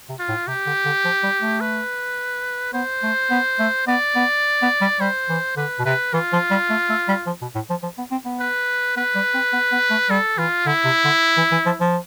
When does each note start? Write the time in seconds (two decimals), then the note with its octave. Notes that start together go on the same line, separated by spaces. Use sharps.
0.09 C3
0.19 F4
0.29 A2
0.47 C3 G4
0.66 D3
0.85 D3
1.04 F3
1.23 G3
1.41 A3
1.61 B4
2.73 B3 C5
3.03 A3
3.30 B3
3.59 A3
3.87 B3 D5
4.16 B3
4.62 B3
4.81 G3
5.00 G3 C5
5.29 E3
5.57 D3 B4
5.79 B2
5.85 C3 B4
6.13 E3 F4
6.33 F3
6.51 G3
6.70 A3
6.89 A3
7.08 G3
7.27 F3
7.42 B2
7.55 A2
7.70 F3
7.83 F3
7.98 B3
8.11 C4
8.25 B3
8.40 B4
8.97 B3 B4
9.15 G3
9.34 C4
9.53 B3
9.72 B3
9.90 A3
10.10 G3 A4
10.38 E3 F4
10.66 D3 E4
10.85 C3
11.05 D3
11.37 E3
11.52 E3
11.66 F3
11.80 F3